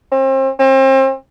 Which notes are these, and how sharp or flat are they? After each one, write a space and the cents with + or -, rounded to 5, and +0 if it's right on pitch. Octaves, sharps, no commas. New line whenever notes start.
C4 +35
C4 +35